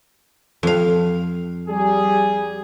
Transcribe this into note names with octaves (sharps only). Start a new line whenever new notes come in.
F2 F5
G3 G#4